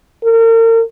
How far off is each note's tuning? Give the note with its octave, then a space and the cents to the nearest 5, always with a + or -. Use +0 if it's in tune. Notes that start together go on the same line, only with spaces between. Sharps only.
A#4 -40